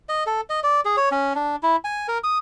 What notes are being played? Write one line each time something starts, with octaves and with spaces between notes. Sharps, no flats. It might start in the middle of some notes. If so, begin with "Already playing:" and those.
D#5
A4
D#5
D5
G#4
C#5
C#4
D4
E4
G#5
A#4
D#6